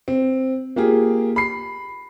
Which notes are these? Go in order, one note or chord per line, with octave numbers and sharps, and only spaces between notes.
C4
A#3 F4 G4 G#4
B5 C7